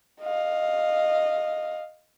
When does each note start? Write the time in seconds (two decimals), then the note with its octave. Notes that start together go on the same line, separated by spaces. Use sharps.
0.21 D#5 F5